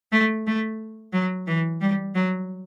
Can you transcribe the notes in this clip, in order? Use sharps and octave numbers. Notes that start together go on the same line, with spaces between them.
A3
A3
F#3
E3
G3
F#3